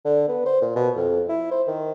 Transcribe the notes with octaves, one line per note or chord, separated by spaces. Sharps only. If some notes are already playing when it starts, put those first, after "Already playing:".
D3
B3
C5
A#2
B2
F2
E4
C5
D#3